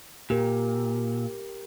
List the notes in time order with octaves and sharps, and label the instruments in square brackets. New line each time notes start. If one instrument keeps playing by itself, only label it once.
[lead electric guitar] A#2 [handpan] G4 A#4